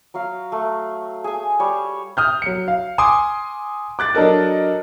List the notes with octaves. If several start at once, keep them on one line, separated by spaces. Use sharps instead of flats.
F#3 F5
A3
G#4 G#5
G3 C#5
D#6 F6 G6
F#3 C#7
F5
G#5 C6 D6 D#6
D6 F#6 A6
F#3 D4 A4 A#4 D#5